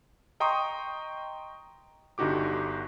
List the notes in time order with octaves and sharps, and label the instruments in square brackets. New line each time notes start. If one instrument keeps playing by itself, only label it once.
[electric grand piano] D#5 G5 A#5 C6 C#6 D#6
G1 D3 D#4 F#4 G4 D6